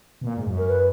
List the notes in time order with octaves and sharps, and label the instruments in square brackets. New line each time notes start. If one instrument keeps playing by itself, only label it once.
[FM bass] B2
A#2
G#2
F#2
[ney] A#4
B4